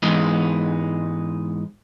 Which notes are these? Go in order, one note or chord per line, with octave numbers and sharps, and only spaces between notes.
G#2 E3 G#3 B3 D#4